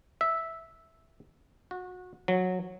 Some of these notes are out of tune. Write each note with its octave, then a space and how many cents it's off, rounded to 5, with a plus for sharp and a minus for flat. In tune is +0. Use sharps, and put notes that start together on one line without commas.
E5 -5
F#4 -25
F#3 -15